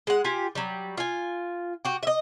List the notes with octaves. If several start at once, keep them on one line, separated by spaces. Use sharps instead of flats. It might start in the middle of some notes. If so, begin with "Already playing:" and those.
G#3 F#5
F4 G4 G#5
F#3 G3
F4 G#5
F#4 G4
D#5 E5